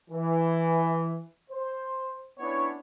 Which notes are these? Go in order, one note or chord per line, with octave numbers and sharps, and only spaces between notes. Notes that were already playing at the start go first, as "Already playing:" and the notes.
E3
C5
B3 C#4 D4 E4 C#5